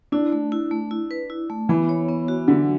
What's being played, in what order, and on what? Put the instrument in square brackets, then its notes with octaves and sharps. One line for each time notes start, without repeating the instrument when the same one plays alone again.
[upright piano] D4 [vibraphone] E4
[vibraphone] A3
E4
A3
E4
B4
E4
A3
[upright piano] E3 [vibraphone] B3
[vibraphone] C#5
B3
F#4
[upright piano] D3 [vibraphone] F#3